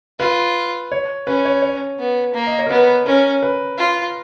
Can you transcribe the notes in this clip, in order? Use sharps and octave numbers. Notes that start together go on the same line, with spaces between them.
F4 B4
C#5
C#4 B4
C#5
C#5
B3
A#3
D#5
C#5
A#4
B3 B4
C#4 A#4
B4
F4